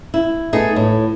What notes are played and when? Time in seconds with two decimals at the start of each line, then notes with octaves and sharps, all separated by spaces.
0.14 E4
0.53 A3 B3 D#4 G#4
0.76 A2